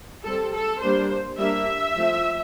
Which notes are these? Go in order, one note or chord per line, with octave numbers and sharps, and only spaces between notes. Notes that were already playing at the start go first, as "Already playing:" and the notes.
G3 C4 A4
A4
G3 A#3 D4 C5
G3 A#3 D4 E5
F3 A3 C4